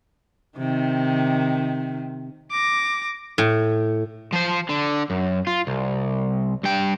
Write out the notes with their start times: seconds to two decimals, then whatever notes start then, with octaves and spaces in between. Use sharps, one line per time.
0.58 C3 D#3
2.51 D6 A#6
3.38 A2
4.33 F3 C5
4.69 D3
5.10 F#2
5.47 F4
5.67 C2
6.64 G2 G5